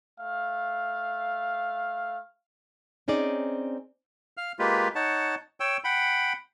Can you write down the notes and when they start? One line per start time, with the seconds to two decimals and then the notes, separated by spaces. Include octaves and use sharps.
0.21 A3 F5
3.08 C4 C#4 D#4 G#4 D5
4.37 F5 F6
4.59 G#3 A#3 F4 G4 B4
4.95 D#4 C#5 F#5 A5
5.60 C#5 G5 E6
5.84 F#5 G5 B5